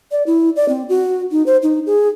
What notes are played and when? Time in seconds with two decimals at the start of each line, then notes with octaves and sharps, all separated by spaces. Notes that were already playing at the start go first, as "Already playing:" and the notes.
0.12 D5
0.27 E4
0.56 D5
0.69 C4
0.89 F#4
1.32 D#4
1.46 C5
1.63 D#4
1.86 G#4